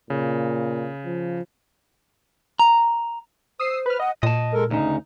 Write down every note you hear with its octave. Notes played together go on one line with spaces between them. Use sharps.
A#2 C#3
F3
A#5
C5 D#6 E6 C7
B4 F6
D#5 F#5
A#2 D#5 A5
G#3 A4 A#4
D2 C#3 D#4